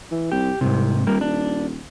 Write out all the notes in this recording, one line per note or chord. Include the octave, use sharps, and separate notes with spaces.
E3
C2 G4
C2 G#2 C3
D#1 G3 A#3 A#4
D4